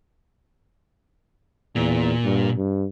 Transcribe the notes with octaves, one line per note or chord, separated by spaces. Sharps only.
E2 A#2
G2
G2